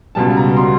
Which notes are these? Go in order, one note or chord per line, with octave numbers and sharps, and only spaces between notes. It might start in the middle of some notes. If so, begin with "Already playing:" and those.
C#2 B2 G3 A5
A#5
B2 G3 C6